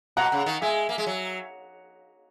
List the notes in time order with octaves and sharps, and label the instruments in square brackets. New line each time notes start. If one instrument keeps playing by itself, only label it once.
[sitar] B2 [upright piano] F#5 A#5
[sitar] C#3
D#3
[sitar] G#3 [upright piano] E5 G#5
[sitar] A#3
G#3
F#3